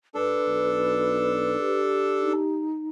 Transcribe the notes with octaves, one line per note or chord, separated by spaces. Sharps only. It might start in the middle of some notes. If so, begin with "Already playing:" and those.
G2 D4 A4 B4
B1
G4
D#4